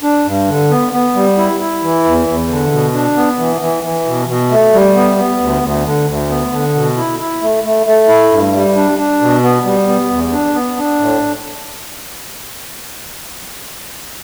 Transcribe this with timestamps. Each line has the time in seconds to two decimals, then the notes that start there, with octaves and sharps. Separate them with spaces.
0.03 D4
0.26 G2
0.48 D3
0.70 B3
0.93 B3
1.15 G3
1.38 E4
1.60 E4
1.82 E3
2.05 E2
2.27 E2
2.49 D3
2.72 B2
2.94 D4
3.16 B3
3.39 E3
3.61 E3
3.84 E3
4.06 B2
4.28 B2
4.50 A3
4.73 G3
4.95 B3
5.18 B3
5.40 D2
5.63 D2
5.85 D3
6.07 D2
6.29 B3
6.52 D3
6.75 B2
6.97 E4
7.19 E4
7.42 A3
7.64 A3
7.86 A3
8.08 E4
8.31 G2
8.53 G3
8.76 D4
8.98 D4
9.21 B2
9.43 B3
9.65 G3
9.88 B3
10.10 E2
10.32 D4
10.54 B3
10.77 D4
10.99 A2